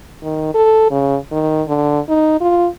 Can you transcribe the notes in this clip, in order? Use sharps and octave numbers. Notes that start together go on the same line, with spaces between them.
D#3
A4
C#3
D#3
D3
D#4
F4